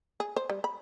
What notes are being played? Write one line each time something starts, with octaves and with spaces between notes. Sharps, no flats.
G#4
C5
G3
B5